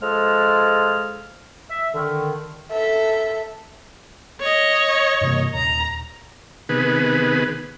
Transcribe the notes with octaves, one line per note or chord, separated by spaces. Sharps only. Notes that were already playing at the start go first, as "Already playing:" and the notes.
F3 G#3 G#4 A4 F6
E5
D3 D#3
A4 E5
C#5 D#5
G2 C3 A#3
D#1 A#5
C3 D#3 B3 G#4 B4